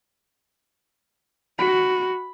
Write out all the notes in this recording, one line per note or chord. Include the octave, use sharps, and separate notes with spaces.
F#4 B5